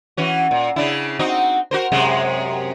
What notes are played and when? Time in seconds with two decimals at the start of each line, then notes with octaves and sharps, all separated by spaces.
0.17 E3 C#4 F#4
0.51 A#2
0.76 C#3 D4 E4
1.19 C4 D#4 F#4
1.71 F#4 A#4 C5
1.92 F#2 C3 G#3